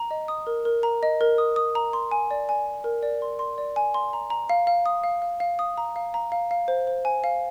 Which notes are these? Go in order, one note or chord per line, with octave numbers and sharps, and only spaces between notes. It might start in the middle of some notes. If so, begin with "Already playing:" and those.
Already playing: A#5
D#5
D#6
A#4
A#4
A#5
D#5
A#4
D#6
D#6
A#5
C6
G#5
D5
G#5
G#5
A#4
D5
C6
C6
D5
G#5
C6
A#5
A#5
F5
F5
D#6
F5
F5
F5
D#6
A#5
F5
A#5
F5
F5
C5
C5
G#5
F5